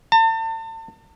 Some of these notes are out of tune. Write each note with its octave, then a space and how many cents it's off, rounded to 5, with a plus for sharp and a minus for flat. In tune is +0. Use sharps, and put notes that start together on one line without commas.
A5 +40